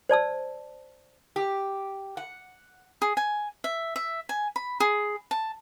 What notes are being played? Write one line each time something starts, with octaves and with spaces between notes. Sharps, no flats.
C5 D5 A5 E6
G4
F#5
G#4
G#5
E5
E5
G#5
B5
G#4
A5